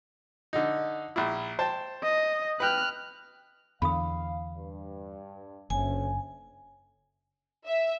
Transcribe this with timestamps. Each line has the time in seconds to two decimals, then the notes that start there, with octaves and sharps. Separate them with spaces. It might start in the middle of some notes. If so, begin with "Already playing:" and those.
0.53 D3 D#4
1.16 A#1 E4
1.59 C5 G5 A5
2.03 D#5
2.60 B4 G5 F6 F#6
3.82 E2 D3 F5 B5 D#6
4.53 G2
5.70 F#1 D2 A3 C#4 G#5
7.66 E5